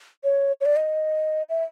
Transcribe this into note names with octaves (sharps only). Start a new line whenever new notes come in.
C#5
C#5
D5
D#5
E5